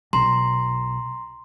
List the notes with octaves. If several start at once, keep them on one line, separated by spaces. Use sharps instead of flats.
B1 A#5 C6